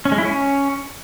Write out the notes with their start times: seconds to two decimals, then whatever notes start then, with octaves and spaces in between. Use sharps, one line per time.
0.05 C#4
0.12 G#3
0.18 E4
0.25 C#4